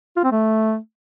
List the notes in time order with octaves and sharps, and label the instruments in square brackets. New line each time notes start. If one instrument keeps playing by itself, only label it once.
[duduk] F4
C4
A3